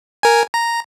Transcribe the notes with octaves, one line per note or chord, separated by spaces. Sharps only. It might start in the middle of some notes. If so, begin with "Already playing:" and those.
A#4 G#5
A#5